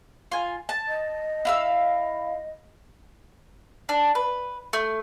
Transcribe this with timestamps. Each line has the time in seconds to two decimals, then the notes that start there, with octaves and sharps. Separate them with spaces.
0.32 F4 G#5
0.69 A5
0.88 D#5
1.45 E4 F5 E6
3.89 D4
4.15 B4
4.73 A3